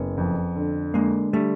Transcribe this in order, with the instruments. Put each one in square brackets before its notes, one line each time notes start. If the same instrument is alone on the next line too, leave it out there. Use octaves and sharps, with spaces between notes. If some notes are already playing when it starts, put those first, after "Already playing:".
Already playing: [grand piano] F#1 [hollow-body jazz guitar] B3 C#4
[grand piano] F2
D3
[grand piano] D3 [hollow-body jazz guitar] G#3 A#3
[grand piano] D3 [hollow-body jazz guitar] G3 A3